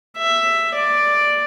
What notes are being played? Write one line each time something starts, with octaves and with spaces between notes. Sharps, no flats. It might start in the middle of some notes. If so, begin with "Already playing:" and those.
E5
D5